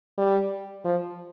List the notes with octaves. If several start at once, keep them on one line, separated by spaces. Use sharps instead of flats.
G3
F3